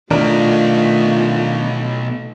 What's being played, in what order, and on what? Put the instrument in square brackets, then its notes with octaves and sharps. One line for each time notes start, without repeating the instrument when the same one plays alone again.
[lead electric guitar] B2 D#4 [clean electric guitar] D#3 D4 A#4 [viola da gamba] A3 [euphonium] F4